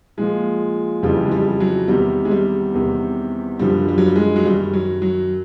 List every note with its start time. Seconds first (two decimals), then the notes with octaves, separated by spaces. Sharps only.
0.17 A#2 F3 G#3
1.03 F2 C#3 E3 G3
1.26 G#3
1.31 G3
1.60 F#3
1.88 E2 C3 D#3 G3
2.25 G#3
2.31 G3
2.74 E2 C3 D#3
3.59 F#2 D3 F3 G3
3.88 G3
3.98 F#3
4.06 G3
4.16 G#3
4.36 F#3
4.44 F#2 D#3 G3
4.73 F#3
5.02 F#3